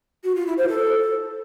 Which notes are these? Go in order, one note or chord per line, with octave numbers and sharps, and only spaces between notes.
F#4
F4
E4
C5
A4